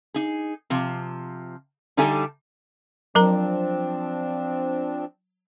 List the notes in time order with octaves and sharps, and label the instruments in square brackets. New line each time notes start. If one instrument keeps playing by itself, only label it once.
[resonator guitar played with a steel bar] D#4 G#4
C3 F3
D3 G3 D#4 A4 E5 G#5
[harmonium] F3 C4 D4 [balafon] F#3 A#4 A#5